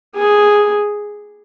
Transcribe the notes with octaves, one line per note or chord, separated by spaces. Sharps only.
G#4